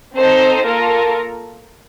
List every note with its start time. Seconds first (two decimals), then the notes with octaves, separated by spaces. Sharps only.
0.16 C4 D#4 A4 C5
0.64 A#3 F4 A4 A#4